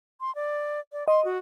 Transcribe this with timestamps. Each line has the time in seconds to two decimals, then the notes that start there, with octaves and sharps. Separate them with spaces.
0.21 C6
0.35 D5
0.92 D5
1.08 D#5 C6
1.25 F#4